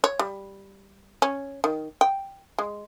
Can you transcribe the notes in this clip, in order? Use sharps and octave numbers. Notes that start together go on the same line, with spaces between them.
C#5
G3
C#4
D#3
G5
G#3